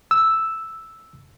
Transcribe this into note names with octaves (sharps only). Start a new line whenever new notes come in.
E6